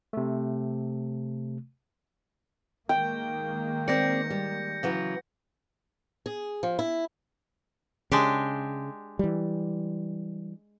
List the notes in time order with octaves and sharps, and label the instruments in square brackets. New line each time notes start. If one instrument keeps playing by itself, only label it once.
[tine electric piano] C3 A3
[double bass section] D#3 G#3 A#3 [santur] G5 [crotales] G6
[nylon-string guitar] C4 D5 [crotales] G6 A#6 C#7
[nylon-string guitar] G3
C#3 E3 F#3
[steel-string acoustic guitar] G#4
F3
E4
[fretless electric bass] C#3 [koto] G#3 D4 G4
[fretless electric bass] E3 G3